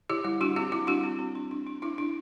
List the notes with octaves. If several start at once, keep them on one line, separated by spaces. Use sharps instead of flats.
D3 E4 G4
G3 E4
G3 D4 F#4
C4 E4 G4
G3 E4
G3 D4 F#4
C4
C4
D4
D4
D4
D4 E4
D4